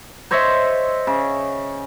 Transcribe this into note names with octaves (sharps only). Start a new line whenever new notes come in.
C5 C#5 D#5 E5
C#3